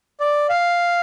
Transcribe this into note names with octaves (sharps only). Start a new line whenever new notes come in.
D5
F5